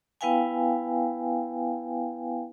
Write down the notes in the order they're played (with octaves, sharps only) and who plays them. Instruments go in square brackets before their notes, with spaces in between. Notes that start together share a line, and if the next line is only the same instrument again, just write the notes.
[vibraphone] B3 E4 B4 F5 G5 G#5